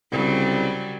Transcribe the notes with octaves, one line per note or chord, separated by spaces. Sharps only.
C2 C#3 F#3 G3